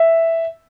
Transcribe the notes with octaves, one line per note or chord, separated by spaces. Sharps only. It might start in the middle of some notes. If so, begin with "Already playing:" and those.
Already playing: E5